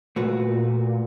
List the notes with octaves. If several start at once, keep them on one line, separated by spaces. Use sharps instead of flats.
A#2 A3 F#4 B4